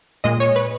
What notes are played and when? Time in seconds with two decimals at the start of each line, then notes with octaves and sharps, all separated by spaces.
0.24 A#2 G#3 D#5
0.40 C#5
0.56 B4